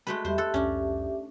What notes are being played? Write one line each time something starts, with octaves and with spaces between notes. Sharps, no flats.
G#3 A3 F#4 B4
E2 G3 G4 C5 E5 C6
A4 C6 E6 F#6
C2 F2 C#4 D4